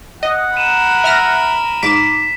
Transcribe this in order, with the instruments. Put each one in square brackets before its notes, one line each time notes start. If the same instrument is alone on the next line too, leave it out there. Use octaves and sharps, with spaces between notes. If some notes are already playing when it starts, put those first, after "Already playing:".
[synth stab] D#5 [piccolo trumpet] F#5
[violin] A#4 B5 [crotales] D#7 E7
[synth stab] E5 F6 A#6
[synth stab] G#2 D6 E7 [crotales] B6